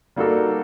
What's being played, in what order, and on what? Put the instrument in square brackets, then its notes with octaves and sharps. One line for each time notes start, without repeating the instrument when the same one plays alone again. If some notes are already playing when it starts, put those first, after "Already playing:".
[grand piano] G3 A#3 D#4 F#4 A4